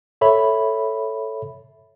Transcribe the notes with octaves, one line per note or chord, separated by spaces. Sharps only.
A4 C#5 E5 B5